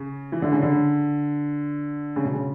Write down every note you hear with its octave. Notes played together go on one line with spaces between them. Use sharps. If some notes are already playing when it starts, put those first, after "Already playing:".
Already playing: C#3
E3
D3
C#3
D3
C#3
B2
C#3